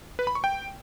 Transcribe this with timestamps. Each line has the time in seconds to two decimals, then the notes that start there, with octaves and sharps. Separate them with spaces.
0.19 B4
0.27 B5
0.35 C#6
0.44 G5